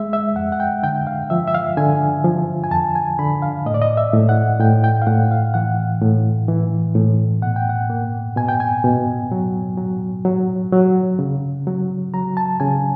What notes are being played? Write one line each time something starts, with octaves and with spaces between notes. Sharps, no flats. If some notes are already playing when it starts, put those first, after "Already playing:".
Already playing: G#3 E5
E5
F2 F#5
F#5
G5
D3 G5
F5
F3 E5
E5
F5
D3 G#5
F3
G#5
F2 A5
G#5
D3 B5
F5
A2 D#5
D5
D#5
E5
A2
F#5
A2 G5
G5
F5
A2 F#5
F5
E3 F#5
A2
E3
A2
B2 F#5
G5
F#5
A#3
B2 G#5
G5
G#5
B2
F#3
F#3
F#3
F#3
C#3
F#3
F#3 A#5
A5
C#3 G#5